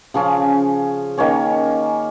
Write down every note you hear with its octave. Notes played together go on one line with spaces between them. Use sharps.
C#3 F3 C#4
D#3 A#3 C#4 C#5